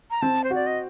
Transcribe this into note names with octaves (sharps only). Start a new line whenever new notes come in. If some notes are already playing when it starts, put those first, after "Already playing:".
A#5
C4 A5
C5
F#4 D5
D#5